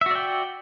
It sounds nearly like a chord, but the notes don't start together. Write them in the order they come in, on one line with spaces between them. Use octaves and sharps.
E5 F#4 D5 G5